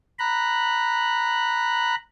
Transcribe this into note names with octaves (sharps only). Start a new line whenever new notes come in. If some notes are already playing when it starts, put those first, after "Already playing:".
A#5 B5 F#6